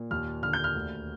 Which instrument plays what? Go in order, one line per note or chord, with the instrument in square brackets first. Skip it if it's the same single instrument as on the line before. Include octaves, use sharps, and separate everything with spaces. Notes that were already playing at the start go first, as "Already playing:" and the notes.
Already playing: [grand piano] A#2
D#2 F6
D3 F6
G6
F6
D2